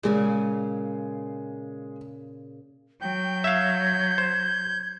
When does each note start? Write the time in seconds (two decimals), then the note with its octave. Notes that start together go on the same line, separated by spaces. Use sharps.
0.03 A#2 C#3 G#3 G#4 G#5
3.01 F#3 G5 G6
3.44 E5 F5 G#6
4.18 C5